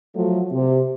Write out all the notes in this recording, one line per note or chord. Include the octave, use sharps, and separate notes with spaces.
F3 F#3 A3
C3